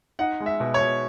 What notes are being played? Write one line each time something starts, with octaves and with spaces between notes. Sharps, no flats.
D#4 F#5
G#3
E5
B2
C#5
B2